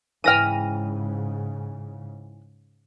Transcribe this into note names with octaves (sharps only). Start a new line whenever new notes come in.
G#2 C#3 E3 B4 G5 F6 A#6 D#7